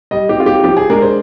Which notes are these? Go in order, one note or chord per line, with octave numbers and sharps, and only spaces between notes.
G3 D#5
G4
C4 F4
G4
F3 G4
G#4
G#3 D4 A#4
C5